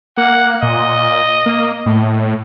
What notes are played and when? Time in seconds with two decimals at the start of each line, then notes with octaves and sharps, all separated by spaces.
0.17 A#3 F#5
0.63 A#2 D#5
1.46 A#3
1.86 A2